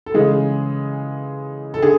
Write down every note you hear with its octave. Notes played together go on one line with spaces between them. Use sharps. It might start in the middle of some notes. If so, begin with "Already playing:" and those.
A4
C#3 E3 G#3 G#4
A4
D3 G#4